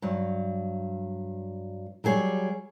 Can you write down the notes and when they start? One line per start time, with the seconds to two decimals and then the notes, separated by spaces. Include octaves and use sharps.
0.02 G2 F#3
2.04 F#3 G3 G#4 C5 C#5